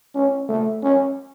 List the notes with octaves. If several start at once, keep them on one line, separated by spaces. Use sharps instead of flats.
C#4
A3
C#4